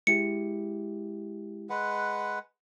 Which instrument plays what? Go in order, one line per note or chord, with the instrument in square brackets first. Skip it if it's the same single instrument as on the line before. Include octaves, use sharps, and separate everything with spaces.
[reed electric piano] G#3 E4 G4 [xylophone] C#7
[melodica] G#3 B4 F#5